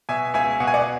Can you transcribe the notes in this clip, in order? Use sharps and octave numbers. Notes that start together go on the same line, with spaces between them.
B2 E5 G#5
C#2 E5 G#5
B2 F#5
G#5
D5 F#5